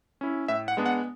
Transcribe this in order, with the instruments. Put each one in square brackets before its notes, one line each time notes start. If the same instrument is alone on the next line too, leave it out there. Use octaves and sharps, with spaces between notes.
[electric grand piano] C#4 E4
A2 E5
F#5
G#3 B3 D4
F#5